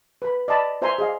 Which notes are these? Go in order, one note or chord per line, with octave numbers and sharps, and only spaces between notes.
B4 B5
D5 D#5 A5 B5
F4 C5 E5 G#5 A#5 C6
G#4 D#5 F5